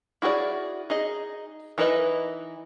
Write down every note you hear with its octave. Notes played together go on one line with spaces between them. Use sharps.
E4 F#4 G#4 C5 D5
D#4 G#4 D#5
E3 D#4 E4 B4 D#5